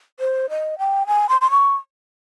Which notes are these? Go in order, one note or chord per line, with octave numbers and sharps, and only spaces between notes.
C5
D#5
G5
G#5
C6
C6
C#6